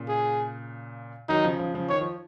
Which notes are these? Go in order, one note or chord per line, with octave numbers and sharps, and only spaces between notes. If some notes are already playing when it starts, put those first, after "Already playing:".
Already playing: A#2 C#3
G#4
D#3 F#3 D#4
C#3 F3
C#3 F3
C#3 F3
D#3 C#5
F3